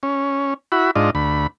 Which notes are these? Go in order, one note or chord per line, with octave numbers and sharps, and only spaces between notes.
C#4
E4 F#4 B5
G#2 D4 F4 D#5
D2 B5